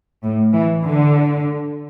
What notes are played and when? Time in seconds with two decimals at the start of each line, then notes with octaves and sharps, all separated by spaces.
0.24 A2
0.53 E3
0.84 D3